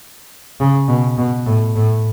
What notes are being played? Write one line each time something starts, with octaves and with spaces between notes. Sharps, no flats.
C#3
B2
B2
A2
A2